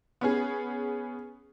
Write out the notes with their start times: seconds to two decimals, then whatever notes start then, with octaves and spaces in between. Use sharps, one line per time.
0.21 B3 C#4 G#4